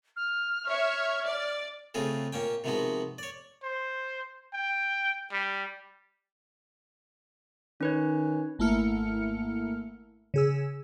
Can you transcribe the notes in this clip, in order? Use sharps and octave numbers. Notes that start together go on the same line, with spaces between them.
F6
C#5 E5
D5
C#3 A3 C4 F4 G#4
A#2 A#3 C#4 G5
C3 D#3 F3 G#3 B3 F#4
C#5 D5
C5
G5
G3
D#3 C#4 B4 C#5
G#1 A3 A#3 E4 F6 C#7
C#3 G#4 E6